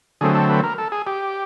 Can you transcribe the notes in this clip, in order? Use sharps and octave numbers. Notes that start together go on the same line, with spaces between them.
D3 F#3 A3 C4 G#4
A4
B4
A#4
A4
G#4
G4